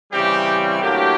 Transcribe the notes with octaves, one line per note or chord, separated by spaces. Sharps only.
C#3 E3 G3 C4 G4
A2 F#3 A#3 D4 G4